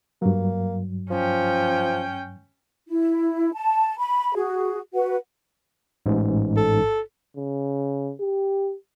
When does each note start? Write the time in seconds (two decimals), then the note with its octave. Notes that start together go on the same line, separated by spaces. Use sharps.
0.22 G2 F#3 A#3
1.10 F3 C#4 G5
2.87 E4
3.54 A5
3.97 B5
4.35 F#4 G#4
4.94 F#4 B4 F#5
6.06 A1 G#2
6.57 A4
7.37 C#3
8.20 G4